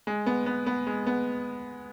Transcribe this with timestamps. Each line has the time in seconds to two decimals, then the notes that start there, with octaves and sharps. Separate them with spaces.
0.07 G#3
0.26 B3
0.46 B3
0.66 B3
0.87 G#3
1.06 B3